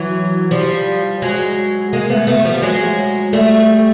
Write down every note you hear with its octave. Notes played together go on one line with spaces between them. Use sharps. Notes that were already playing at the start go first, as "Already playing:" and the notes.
Already playing: E3 F#3
F3 G3
F#3 G#3
G#3 A#3
A3 B3
A3 B3
F3 G3
F#3 G#3
G3 A3